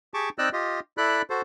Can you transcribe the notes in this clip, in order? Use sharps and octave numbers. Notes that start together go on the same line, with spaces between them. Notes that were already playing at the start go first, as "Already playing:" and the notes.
G4 G#4 A5 C#6 D6
C4 D#4 D5 D#5 E6 F#6
F4 G4 D#5
E4 A4 D5 B5 F#6
F#4 A4 C5